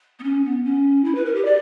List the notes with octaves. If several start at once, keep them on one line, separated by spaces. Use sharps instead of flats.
B3
C#4
B3
C#4
E4
B4
A#4
G4
D5